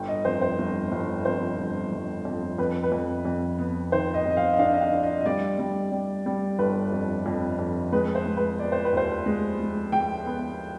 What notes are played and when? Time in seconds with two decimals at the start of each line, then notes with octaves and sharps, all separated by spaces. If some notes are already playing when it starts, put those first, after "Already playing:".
Already playing: G1 G5
0.08 D#5
0.25 F2 C5
0.42 C5
0.58 G1
0.92 G1
1.25 F2 C5
1.58 G1
1.92 G1
2.25 F2
2.58 F2 B4
2.83 B4
2.92 F2
3.25 F2
3.59 B3
3.92 D#3 C5
4.14 D#5
4.26 F2 D#5
4.37 F5
4.53 D#5
4.59 D4 F5
4.74 D#5
4.81 F5
4.92 D4
5.03 D#5
5.21 D#5
5.26 G3 D5
5.59 G3
5.92 G3
6.26 G3
6.59 G1 B4
6.92 F2
7.26 F2
7.59 F2
7.92 G#3 B4
8.15 C5
8.26 G#3
8.37 B4
8.59 B3 D5
8.72 C5
8.85 B4
8.93 D#2 C5
9.26 G#3
9.59 G#3
9.92 G#3 G5
10.26 B3